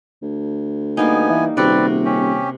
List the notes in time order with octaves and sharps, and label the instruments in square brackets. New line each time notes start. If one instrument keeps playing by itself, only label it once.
[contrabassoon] D2
[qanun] G3 A#3 D#4 [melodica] B3 G#5
[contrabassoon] E3
[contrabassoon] D#1 [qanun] C3 F#4 [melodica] C4 B4 D5
[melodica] C#4 G4